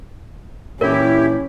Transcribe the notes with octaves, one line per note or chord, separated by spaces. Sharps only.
A#2 E3 C#4 E4 G4 A#4 C#5